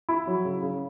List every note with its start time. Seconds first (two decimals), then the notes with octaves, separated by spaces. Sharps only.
0.09 E4
0.27 F#3
0.45 C#3
0.62 C#3